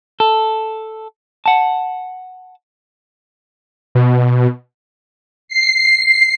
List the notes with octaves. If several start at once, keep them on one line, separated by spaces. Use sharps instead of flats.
A4
F#5 A5
B2
C7